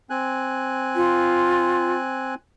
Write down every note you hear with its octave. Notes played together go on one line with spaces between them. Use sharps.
C4 G#5 F#6
F4